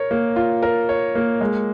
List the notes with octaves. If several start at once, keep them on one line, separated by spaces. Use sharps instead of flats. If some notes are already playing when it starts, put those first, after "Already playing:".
Already playing: A#4 C#5
A#3
F4
A#4
C#5
A#3
G#3